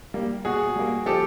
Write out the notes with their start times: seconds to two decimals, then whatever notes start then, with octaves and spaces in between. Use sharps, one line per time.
0.14 G3 A#3
0.45 B2 F#4 G#4
0.75 G3 A#3
1.06 F3 G4 A4